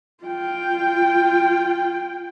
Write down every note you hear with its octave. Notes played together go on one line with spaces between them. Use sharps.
F4 G5